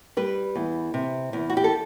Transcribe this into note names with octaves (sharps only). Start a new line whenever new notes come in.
G3 B4
E2
C3
E2
F#4
G4
A4